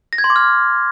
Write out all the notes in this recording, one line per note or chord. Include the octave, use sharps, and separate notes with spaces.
A#6
G#6
C6
D6
F6